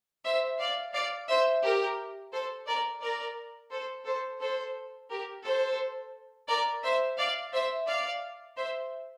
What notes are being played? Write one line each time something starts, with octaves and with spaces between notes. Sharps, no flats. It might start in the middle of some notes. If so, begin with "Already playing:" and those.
C5 E5
D5 F5
D5 F5
C5 E5
G4 A#4
A4 C5
A#4 D5
A#4 D5
A4 C5
A4 C5
A4 C5
G4 A#4
A4 C5
A#4 D5
C5 E5
D5 F5
C5 E5
D5 F5
C5 E5